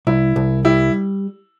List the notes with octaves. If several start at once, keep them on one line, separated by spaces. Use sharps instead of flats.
C2 E4
C2
G3 E4